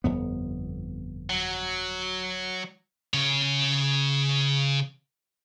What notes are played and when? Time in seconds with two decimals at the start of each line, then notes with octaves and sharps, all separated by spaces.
0.04 G1 F2 B3
1.30 F#3
3.14 C#3 C#5